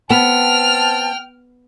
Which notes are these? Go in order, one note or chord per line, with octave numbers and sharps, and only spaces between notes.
B3 C4 G5 A5 F6